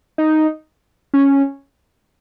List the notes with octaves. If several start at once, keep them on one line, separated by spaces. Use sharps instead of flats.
D#4
C#4